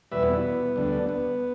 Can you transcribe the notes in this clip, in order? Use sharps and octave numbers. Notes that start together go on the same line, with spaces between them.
E2 B2 G3 B4 E5
B3 E4
B3
D2 D3 G3
B3